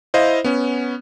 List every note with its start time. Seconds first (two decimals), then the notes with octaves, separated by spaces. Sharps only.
0.14 E4 C5 D#5 F5
0.44 B3 C#4